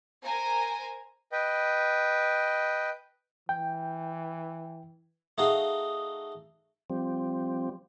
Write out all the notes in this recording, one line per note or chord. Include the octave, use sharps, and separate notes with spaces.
A#4 C5 G#5 A#5
B4 D#5 G5
E3 G5
A3 D#4 F#4 G#4 F5
F3 G3 C4